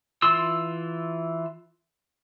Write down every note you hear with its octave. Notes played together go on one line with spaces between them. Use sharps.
E3 F4 C6 E6